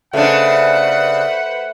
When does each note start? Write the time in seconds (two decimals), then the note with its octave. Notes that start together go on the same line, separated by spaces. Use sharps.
0.13 C#3 A3 D4 B4 C5 F#5